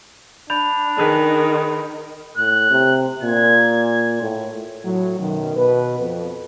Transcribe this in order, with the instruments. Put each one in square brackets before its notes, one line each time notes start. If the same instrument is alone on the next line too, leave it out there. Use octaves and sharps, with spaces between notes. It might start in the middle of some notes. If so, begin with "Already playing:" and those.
[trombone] D4 [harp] D5 [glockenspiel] B5 G6 F7
[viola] D#3 [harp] G#4 B4
[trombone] A2 [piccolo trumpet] F#6
[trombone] C3
[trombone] A#2 [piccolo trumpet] G#6
[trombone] A2
[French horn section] A2 F#3
F#2 B2 D#3
B2 B4
F2